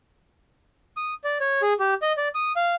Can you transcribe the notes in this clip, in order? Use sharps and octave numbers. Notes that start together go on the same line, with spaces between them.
D#6
D5
C#5
G#4
G4
D#5
D5
D#6
F5